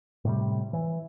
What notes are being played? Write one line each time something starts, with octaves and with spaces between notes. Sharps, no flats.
A2 C3 G3
E3